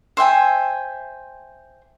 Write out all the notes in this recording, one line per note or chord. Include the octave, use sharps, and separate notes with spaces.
C5 E5 G5 G#5